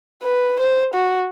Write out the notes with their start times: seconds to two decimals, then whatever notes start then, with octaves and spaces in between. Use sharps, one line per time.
0.23 B4
0.60 C5
0.94 F#4